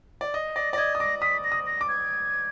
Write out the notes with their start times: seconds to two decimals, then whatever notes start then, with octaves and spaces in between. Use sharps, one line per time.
0.21 D5
0.34 D#5
0.56 D5 A#6
0.73 D5 A#6
0.78 D#5 G#6
0.95 D#6
0.99 D6 A#6
1.22 D#6 B6
1.44 A#6
1.52 D#6
1.66 A#6
1.81 D6
1.88 G#6